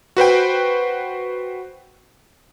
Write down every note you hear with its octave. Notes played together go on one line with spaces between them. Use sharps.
F#4 B4 C5 G5